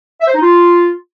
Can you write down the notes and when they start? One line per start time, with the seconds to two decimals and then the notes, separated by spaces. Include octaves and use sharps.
0.20 E5
0.27 C5
0.34 D#4
0.41 F4